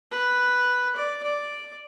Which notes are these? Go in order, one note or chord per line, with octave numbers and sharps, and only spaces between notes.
B4
D5
D5